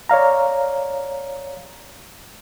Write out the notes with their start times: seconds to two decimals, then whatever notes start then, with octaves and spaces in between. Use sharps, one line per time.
0.09 C#5 D5 F5 A#5